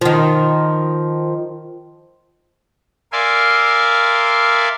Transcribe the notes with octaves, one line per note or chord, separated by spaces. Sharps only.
D#3 F3
A#4 D5 E5 F5 G#5 C6